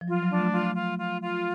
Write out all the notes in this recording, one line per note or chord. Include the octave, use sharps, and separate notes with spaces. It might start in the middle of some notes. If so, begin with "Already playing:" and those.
F3
F#3 F4
F#3
D4
A3
F4
F4
F4
F4